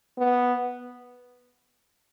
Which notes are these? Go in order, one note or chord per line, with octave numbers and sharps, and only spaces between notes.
B3